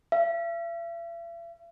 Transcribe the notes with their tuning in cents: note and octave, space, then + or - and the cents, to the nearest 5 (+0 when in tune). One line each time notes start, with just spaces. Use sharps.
E5 +45